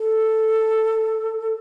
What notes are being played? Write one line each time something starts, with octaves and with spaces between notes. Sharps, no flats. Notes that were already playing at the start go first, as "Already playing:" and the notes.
Already playing: A4